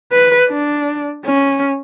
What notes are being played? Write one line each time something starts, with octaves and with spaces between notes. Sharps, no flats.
B4
D4
C#4